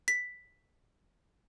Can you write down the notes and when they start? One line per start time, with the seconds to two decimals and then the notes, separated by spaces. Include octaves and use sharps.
0.08 B6